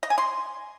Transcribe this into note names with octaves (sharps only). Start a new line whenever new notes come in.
D#5
G#5
C6